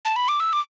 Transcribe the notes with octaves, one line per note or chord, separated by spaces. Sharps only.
A5
B5
D6
E6
D6